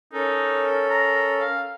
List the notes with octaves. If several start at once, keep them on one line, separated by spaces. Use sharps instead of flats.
C#4 D#4 A4 A#4
A#5
F5